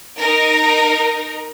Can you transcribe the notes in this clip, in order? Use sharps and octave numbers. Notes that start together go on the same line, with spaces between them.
D#4 A#4